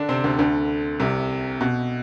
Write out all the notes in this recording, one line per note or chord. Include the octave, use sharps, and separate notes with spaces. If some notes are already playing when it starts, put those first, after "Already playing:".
Already playing: D3 D4
C3 C4
D2 D3
D2 D3
C2 C3
B2